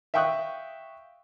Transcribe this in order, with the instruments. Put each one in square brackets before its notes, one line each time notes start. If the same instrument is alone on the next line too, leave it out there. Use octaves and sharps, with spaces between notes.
[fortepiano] E5 F5 G5 C#6 D#6 F#6